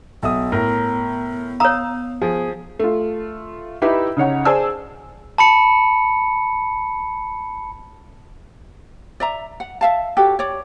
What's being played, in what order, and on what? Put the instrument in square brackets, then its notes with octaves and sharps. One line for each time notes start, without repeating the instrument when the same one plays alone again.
[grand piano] B1 E5 D#6 [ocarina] B3
[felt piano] A2 [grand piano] A#4 A#5
[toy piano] C#5 A#5 [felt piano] F5 [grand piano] D#6 E6
[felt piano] F3 [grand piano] G#4
[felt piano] A3 F4
D#4 E4 G4 B4 E5
C#3 D#4 C#5 F#5
G#4 C5 D5 G#5 A5 E6
[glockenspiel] A5 B5 C#7
[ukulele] D5 E5 A#5
F#5
E5 F5 A5
F#4 G4 A4 C#5
C#5 D5